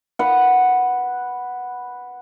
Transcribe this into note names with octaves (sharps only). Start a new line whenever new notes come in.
B4 F#5